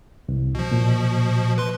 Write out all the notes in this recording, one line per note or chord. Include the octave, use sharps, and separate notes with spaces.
C2
B2 F3
A#2
B4 C6